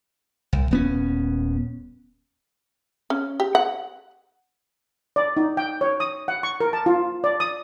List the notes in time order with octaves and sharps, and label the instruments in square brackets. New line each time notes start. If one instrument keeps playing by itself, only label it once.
[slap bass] C2
D#1 B3 C#4
[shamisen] C#4
G4
F#5
[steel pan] D5
D#4
G5
C#5
D#6
F#5
C#6
A#4
A5
F4
D5
D#6